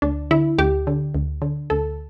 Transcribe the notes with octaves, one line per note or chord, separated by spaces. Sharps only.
D2 D4
D3 E4
D2 G4
D3
D2
D3
D2 A4